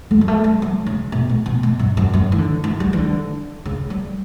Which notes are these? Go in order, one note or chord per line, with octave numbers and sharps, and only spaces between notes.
A3
G3
A3
G3
F#3
C#3
B2
A2
B2
B2
G2
F#2
F#2
E3
D3
E3
G3
E3
D3
C#3
G3